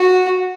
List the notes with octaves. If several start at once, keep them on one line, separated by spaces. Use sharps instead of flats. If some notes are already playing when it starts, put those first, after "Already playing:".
Already playing: F#4